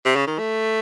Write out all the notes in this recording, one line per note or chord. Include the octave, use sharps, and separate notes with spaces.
C3
C#3
D#3
A3